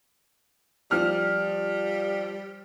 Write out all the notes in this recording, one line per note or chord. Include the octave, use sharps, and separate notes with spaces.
F3 G3 F6